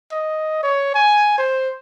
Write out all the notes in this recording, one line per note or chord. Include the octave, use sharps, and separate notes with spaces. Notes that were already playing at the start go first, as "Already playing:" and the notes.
D#5
C#5
G#5
C5